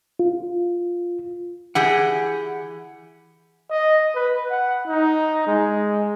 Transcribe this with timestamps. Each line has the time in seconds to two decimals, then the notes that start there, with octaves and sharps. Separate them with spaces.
0.19 F4
1.75 E3 G4 G#4 F#5
3.70 D#5
4.15 B4
4.51 F#5
4.87 D#4
5.47 G#3